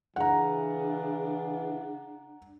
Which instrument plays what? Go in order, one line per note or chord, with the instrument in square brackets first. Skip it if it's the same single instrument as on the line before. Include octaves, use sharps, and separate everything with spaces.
[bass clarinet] C#3 [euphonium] E3 [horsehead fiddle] D4 [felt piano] F#5 A#5